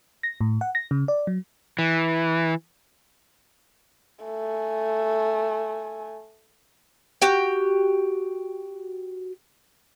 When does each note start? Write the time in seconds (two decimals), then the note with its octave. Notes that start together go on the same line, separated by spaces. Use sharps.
0.23 A#6
0.41 A2
0.61 F#5
0.75 A#6
0.91 C#3
1.08 D5
1.27 F#3
1.79 E3
4.25 A3 G#5
7.22 F#4 G4 G5